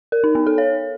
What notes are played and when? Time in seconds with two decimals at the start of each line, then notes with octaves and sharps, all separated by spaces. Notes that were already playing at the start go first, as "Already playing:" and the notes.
0.12 A#4
0.24 D#4
0.35 B3
0.47 A4
0.58 C#5